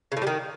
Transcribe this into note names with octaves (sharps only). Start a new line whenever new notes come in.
C#3
A2
G3
D#3